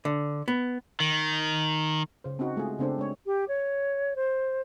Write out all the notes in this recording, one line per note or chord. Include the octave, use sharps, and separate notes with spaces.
D3
B3
D#3
C#3 C5
C4 C#4 D#4 F#4
G#3 A3 F4 G#4
C#3 B3 C4 D4 A4 C5
G#3 D4 C#5
G4
C#5
C5